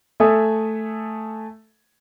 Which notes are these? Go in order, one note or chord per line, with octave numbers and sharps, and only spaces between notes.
A3 A4 E5 G#5 D#6